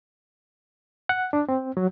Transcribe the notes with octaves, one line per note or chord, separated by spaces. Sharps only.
F#5
D4
C4
F#3